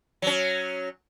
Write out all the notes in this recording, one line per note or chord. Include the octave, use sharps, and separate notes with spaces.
F#3 C#4